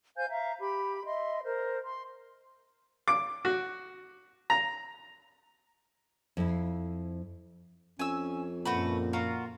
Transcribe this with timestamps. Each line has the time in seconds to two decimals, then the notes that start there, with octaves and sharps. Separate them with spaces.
0.17 C5 F5 G#5 G6
0.29 E5 F5 A#5
0.59 G4 B5
1.04 D#5 E5 C6
1.43 A#4 C5
1.82 C6
3.08 D6
3.45 F#4
4.50 A#5
6.37 F2 E4
7.99 F2 C#4 G#5 E6
8.65 F#2 A#2 A3 F#4 B4
9.13 F4 F#4 A#4